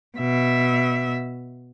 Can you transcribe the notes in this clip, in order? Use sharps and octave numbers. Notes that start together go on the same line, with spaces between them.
B2 E5